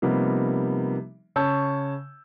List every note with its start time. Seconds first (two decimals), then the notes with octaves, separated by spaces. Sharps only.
0.02 C3 F3 G3 A#3 B3 D#4
1.36 C#3 C#5 A5 C#6 E6 G6